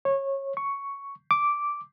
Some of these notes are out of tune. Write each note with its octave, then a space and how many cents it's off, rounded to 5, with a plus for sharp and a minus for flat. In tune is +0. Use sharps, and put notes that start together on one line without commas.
C#5 -20
C#6 +5
D6 -5